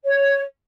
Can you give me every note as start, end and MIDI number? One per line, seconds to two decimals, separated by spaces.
0.04 0.41 73